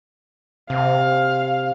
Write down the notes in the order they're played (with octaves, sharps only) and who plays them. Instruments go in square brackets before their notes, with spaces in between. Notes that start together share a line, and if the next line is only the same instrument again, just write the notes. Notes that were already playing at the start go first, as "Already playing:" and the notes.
[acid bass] C3 [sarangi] F5